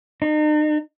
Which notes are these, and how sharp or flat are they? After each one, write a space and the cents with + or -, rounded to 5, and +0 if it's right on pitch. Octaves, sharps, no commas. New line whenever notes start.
D#4 -40